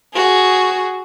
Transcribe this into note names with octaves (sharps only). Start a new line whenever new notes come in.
F#4 G#4